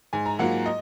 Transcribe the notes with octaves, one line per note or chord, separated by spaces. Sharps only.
G#2 G#5
A#5
F#3 A#3 F4 F#5
D#5